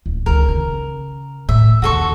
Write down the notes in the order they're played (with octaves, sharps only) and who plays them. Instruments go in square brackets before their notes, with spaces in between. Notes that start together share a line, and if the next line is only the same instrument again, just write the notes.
[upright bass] D1
[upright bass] C#2 D#3 [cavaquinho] A#4
[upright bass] C#3
[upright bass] A2 [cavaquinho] E5
[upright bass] D#2 C#3 [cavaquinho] F#4 A4 C#6